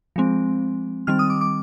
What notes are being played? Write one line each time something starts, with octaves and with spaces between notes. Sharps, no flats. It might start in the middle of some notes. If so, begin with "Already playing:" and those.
F3 G#3 C4
D#3 G3 C4 F6
D#6
D6
D6